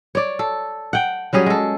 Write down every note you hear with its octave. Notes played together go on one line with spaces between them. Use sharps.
C#5 D5
A4
F#5 G5
F#3 G3 C#4 G#4
G#3 A4